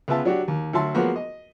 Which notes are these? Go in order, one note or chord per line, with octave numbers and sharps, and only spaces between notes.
C#2 B3 F4 E5 A5
F#3 D4 F#4 G4
D#2
D2 F#3 E5 A5 C6
F3 F#3 G#3 A#3 B3 F#4
D#5